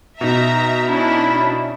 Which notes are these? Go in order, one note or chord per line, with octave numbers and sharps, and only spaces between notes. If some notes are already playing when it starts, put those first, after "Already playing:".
B2 D#4 E5 A#5
C#4 D4 E4